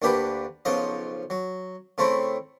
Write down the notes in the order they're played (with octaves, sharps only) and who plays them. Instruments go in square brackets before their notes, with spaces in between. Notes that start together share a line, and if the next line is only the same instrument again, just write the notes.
[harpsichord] D2 A#3 D4 G4 B4
B1 C#3 F3 D#5
F#3
C#3 A3 C4 E4